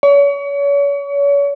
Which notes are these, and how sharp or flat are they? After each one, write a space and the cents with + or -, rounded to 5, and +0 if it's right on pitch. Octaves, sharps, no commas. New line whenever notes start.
C#5 +35